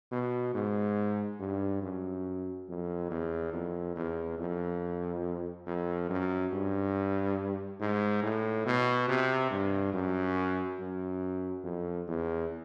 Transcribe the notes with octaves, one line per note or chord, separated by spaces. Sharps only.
B2
G#2
G2
F#2
F2
E2
F2
E2
F2
F2
F#2
G2
G#2
A2
B2
C3
G2
F#2
F#2
F2
E2